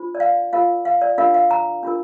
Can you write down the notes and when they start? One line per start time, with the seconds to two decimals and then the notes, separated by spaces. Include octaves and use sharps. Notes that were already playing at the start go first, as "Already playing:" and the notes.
Already playing: D4 F4 C5
0.15 D5
0.20 F5
0.53 F4 A#4 F5
0.85 F5
1.02 D5
1.18 D4 F4 A#4 F5
1.34 F5
1.51 A#5
1.83 D4 F4 A#4